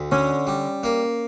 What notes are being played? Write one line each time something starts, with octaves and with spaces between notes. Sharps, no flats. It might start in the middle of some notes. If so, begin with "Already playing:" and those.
Already playing: D2
D3 C#4
G3
A#3